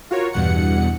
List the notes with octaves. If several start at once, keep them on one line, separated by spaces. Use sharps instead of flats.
F4 F#4 A#4 C#5
E2 G2 B2 F#5 C#7